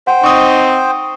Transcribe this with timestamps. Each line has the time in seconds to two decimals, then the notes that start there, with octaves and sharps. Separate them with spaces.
0.07 C5 F#5 G5
0.24 C4 D#4 C#6 D#6